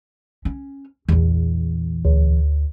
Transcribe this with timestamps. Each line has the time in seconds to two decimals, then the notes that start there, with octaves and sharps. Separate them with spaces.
0.45 C#4
1.08 A#1 E2
2.05 D2